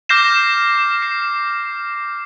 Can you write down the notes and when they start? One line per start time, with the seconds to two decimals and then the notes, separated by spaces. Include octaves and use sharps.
0.09 D6 F6 G6 A#6 C7 E7
1.02 C7